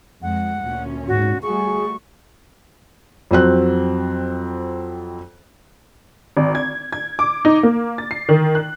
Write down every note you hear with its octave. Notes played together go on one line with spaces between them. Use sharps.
F2 G#3 F#5
D2 A#2 C#4
G#2 F#4
G3 A3 F#4 G#4 C#6
F2 F#3 C4 F#6
G#1
G#6
G#6
D6
D#4
A#3
A6
C7
D#3
F#6